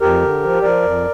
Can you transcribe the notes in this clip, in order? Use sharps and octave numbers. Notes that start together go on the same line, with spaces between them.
F2 G4 A#4
D3
F3
F3 A#4 D5
F2